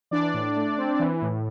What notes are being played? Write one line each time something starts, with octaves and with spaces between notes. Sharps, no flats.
E3 D4 D5
A2
A3
C4
E3
A2